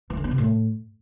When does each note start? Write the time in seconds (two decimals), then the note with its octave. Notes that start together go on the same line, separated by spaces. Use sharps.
0.10 E3
0.17 D3
0.24 B3
0.31 C3
0.38 A2